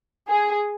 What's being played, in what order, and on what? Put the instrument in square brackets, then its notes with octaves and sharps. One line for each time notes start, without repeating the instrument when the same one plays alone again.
[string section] G#4